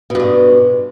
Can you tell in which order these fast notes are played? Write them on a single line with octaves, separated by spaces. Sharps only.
B2 G2 G#3